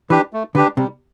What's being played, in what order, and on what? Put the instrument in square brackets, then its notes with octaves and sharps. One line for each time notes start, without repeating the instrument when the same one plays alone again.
[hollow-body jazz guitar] E3 [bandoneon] D4 G4 B4
[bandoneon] A3
[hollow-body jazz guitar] D3 [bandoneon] D4 G4 B4
[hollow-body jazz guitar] C3 [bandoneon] G3